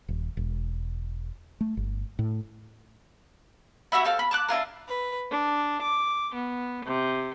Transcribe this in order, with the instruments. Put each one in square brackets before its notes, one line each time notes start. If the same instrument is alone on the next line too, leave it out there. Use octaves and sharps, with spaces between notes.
[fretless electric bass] D#1
E1
A3
G1
A2
[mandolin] E4 F#4 E5 B5
C4 A4 F5
B5
A5 D6 F#6
D4 E4 F4 A#4
[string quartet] B4
D4
D6
B3
C3